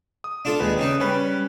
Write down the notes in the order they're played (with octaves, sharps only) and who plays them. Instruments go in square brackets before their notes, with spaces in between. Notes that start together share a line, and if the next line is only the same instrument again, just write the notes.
[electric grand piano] D#6
[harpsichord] D4 F4 A4
[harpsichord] D#2 G#3 [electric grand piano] B4
[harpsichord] C#3 D#4
[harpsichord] G3 [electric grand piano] C#4 B4